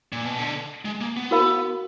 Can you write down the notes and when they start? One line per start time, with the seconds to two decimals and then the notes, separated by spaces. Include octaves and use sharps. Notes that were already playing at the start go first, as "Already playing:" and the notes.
0.13 A#2
0.25 B2
0.39 D3
0.85 G#3
1.01 A#3
1.17 B3
1.31 F#4 A#4 F5 B5